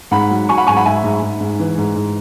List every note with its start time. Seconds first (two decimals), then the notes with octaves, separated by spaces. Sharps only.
0.11 G#2 F#5 B5
0.30 F#3
0.49 F#3 G#5 C#6
0.58 F#5 B5
0.67 G#2 G#5 C#6
0.76 F#5 B5
0.85 G#2 E5 G#5
1.04 G#2
1.22 G#2
1.41 G#2
1.59 E3
1.78 G#2
1.95 G#2